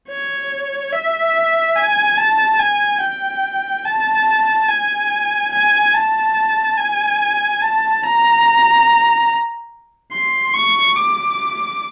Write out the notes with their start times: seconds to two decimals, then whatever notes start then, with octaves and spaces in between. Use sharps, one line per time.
0.09 C#5
0.93 E5
1.76 G#5
2.18 A5
2.60 G#5
3.01 G5
3.85 A5
4.69 G#5
5.52 G#5
5.94 A5
6.78 G#5
7.62 A5
8.03 A#5
10.12 C6
10.54 C#6
10.96 D6